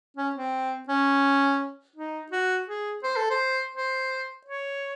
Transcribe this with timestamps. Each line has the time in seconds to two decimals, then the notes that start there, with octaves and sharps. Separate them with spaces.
0.17 C#4
0.35 C4
0.89 C#4
1.96 D#4
2.32 F#4
2.68 G#4
3.04 C5
3.17 A4
3.30 C5
3.75 C5
4.47 C#5